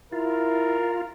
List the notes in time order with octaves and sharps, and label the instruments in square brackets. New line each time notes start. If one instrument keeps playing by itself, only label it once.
[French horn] E4 [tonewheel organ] F4 [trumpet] A#4